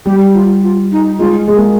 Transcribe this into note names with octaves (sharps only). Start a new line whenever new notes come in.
G3 G4
F4
F4
D#4
G#3 F4
G#3 G#4
A#3